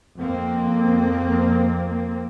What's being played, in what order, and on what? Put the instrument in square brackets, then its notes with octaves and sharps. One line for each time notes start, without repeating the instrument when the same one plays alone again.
[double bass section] F2 A#3 C4